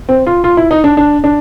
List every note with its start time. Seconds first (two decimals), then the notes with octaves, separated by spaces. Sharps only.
0.09 C4
0.27 F4
0.44 F4
0.57 E4
0.71 D#4
0.84 D4
0.97 D4
1.24 D4